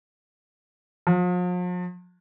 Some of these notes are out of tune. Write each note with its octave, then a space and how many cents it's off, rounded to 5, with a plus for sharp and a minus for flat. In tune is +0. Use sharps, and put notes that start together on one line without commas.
F3 +45